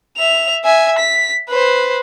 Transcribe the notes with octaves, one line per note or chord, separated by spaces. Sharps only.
E5 F7
E5 G#5
B6
B4 C5